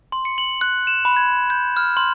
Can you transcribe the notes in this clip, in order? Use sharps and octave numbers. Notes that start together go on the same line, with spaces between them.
C6
C#7
F#7
F#6
E7
B5
G#6
G6
F6
C6